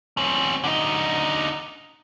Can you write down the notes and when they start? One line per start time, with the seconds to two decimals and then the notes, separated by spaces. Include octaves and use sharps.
0.17 C4 C#4
0.64 D3 D#4